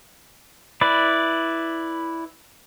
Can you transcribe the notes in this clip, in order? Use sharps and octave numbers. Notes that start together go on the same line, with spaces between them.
E4 B4 D5